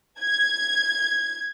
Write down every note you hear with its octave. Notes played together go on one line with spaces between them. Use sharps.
G#6